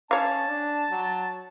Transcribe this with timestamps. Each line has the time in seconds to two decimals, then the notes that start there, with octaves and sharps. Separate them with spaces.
0.11 C#4 C#5 F5 A5
0.48 D4
0.90 F#3